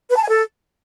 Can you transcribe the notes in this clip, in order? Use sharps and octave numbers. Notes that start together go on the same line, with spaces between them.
B4
A5
G#5
A4